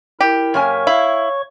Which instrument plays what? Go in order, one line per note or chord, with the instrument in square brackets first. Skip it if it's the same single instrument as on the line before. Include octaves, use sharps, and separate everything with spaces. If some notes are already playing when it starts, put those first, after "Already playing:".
[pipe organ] E4 A#4 [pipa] G4
[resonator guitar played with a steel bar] F#2 A#3 G#5 [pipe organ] C#5 C#6
[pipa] E4 [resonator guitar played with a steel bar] F5